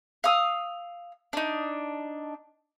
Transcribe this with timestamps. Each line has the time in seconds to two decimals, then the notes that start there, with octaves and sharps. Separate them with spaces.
0.24 F5 D#6 E6
1.33 D4 D#4